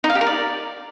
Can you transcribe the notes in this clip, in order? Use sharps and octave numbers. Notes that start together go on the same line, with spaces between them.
D#4
F5
G4
A#4
D5